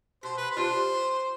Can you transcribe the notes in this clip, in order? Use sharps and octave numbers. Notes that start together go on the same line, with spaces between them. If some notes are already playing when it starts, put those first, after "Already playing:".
B2 C5
B4
C5
G3 D4 F4